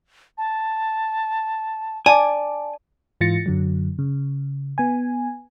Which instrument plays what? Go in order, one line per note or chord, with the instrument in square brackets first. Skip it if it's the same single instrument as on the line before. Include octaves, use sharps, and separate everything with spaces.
[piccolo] A5
[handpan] D5 [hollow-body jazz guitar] G#5 [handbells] A5
[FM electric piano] G#2 E3 F4 A6 A#6 C#7
F#2 D3 F#3
C#3
B3 G#5